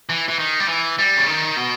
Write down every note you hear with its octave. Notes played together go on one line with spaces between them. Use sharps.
E3
E3
D#3
G3
E3
G3
C#3
D#3
B2